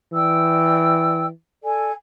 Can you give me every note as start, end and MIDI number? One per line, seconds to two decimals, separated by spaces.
0.13 1.30 52
0.13 1.26 74
0.13 1.26 79
0.13 1.26 88
1.64 1.91 69
1.64 1.91 74
1.64 1.91 80